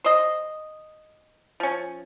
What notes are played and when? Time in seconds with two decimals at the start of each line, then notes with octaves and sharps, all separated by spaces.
0.04 C5 D#5
1.60 F3 C#4